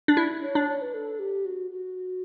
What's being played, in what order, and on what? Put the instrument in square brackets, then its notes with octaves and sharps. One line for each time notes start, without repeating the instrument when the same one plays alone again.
[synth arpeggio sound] D4
E4
[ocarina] C#5
[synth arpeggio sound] D4
[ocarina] C#5
B4
A4
G4
F#4
F#4